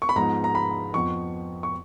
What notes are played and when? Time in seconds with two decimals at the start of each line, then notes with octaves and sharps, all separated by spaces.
0.02 C#6
0.09 B5
0.16 G#2 F3 B3 D#4 A#5
0.44 A#5
0.55 B5
0.94 F2 F3 B3 C#6
1.63 C#6